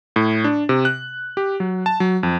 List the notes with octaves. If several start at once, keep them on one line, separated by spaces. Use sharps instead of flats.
A2
D4
C3
F#6
G4
F#3
A5
F#3
F2